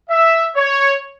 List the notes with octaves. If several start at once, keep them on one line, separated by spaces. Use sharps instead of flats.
E5
C#5